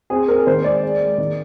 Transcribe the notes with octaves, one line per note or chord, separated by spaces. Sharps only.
C4 G#4
C4 A#4
D#3 C5
G#3 D5
G#3
G#3
D#3